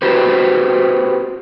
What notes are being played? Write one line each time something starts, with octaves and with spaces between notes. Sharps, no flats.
F#4 G4 B4 C5